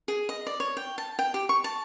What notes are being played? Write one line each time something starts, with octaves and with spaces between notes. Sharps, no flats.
G#4
D#5
D5
C#5
G5
A5
G5
G4
C#6
A5